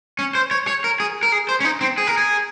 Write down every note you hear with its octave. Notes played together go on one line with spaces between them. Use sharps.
C#4
C5
C#5
C#5
A#4
G#4
A#4
G#4
C5
C#4
D#4
C4
G#4
A#4
G#4